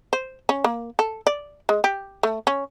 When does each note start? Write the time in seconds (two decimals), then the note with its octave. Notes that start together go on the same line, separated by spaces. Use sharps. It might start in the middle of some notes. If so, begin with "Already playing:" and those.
0.13 C5
0.49 C#4
0.64 A#3
0.99 A4
1.27 D5
1.69 G#3
1.84 G4
2.23 A3
2.47 C#4